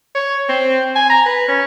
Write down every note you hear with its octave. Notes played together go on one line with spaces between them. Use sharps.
C#5
C4
G#5
A#5
B4
C#4